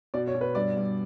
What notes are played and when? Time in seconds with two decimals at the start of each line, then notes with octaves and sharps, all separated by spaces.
0.14 B2 D5
0.27 C#5
0.34 B2
0.41 B4
0.55 G2 D5
0.77 G2